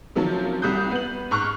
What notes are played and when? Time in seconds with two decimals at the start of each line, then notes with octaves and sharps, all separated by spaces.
0.16 C3 D#3 F3 F#3 C#4
0.62 C2 G3 D#6 F#6 G6
0.91 B3 F#7
1.31 G#2 C#6 F6 F#6